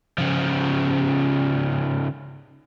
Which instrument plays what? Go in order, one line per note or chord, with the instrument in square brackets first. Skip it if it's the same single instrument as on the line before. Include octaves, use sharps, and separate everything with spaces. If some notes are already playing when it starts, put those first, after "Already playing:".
[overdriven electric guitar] C#3 F3